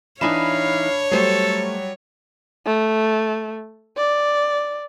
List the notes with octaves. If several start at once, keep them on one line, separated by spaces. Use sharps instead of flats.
E3 D4 D#4 C#5 F5 G#5 B5 E7
F#3 G3 A3 A4 C5
A3
D5